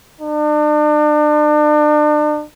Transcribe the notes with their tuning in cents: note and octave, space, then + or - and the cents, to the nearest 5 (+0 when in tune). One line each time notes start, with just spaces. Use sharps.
D4 +35